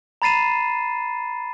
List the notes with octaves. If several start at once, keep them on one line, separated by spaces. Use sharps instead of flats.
A#5 B5 A6 C7 D#7 E7